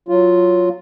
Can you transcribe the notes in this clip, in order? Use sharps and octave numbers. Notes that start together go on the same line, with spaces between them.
F#3 F4